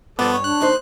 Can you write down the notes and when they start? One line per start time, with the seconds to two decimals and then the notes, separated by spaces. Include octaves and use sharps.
0.19 G2 F3 B3 A4 D5
0.32 C#5
0.44 D4 F#6
0.60 D#2 D#4 C5